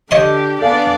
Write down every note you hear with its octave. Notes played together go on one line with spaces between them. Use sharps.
D3 G4 C#5 D#5 C6
B3 D4 A4 D5 F5 G#5